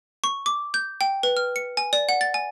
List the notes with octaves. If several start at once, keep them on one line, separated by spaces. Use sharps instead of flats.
C#6
D6
G6
G5
B4
F6
C#7
G#5
D5
F#5
A6
G#5